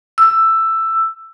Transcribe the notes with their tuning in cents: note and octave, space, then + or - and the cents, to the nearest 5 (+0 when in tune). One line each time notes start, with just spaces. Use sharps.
E6 +10